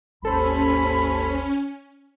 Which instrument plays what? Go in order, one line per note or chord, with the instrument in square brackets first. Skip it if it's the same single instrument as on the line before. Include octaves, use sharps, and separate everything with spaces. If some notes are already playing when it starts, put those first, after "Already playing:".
[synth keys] G#1 A4 C5 [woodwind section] D#2 B5 [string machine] C#4